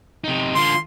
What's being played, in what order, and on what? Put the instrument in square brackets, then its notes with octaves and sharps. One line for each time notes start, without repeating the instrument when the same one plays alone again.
[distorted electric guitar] C3 D#4
[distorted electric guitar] D3 F4 [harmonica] C6